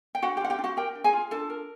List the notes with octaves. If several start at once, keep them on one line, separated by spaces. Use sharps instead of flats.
G5
D4 F#4 F#5
G4 G5
F4 F#5
G4 G5
D4
F#4 F#5
G4 A#4 G5
D4
G#4 G#5
F4
D4 A4 A5
A#4